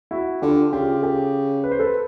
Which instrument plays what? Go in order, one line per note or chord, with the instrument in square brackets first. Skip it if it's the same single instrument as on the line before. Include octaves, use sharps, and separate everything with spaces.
[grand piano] E4 F#4
[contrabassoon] D3 [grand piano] F4 G4
[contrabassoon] C#3 [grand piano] F4 G4
[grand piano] G4 A4
B4
C5
A4 B4